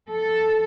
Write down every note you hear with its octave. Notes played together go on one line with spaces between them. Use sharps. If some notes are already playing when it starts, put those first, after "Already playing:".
A4